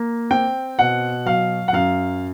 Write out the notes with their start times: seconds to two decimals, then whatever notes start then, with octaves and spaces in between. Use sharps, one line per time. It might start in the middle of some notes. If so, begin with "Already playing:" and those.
Already playing: A#3
0.31 C4 G5
0.79 B2 F#5
1.26 F#3 F5
1.68 F#5
1.73 F#2 F5